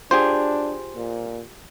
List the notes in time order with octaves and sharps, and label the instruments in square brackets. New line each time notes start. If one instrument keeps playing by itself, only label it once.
[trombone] D4 [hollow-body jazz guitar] F4 G4 G#4 [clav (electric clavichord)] C5
[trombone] A#2